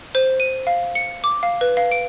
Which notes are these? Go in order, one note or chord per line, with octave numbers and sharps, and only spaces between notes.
C5
D#7
F5
C#7
D6
F5
B4
F5
D7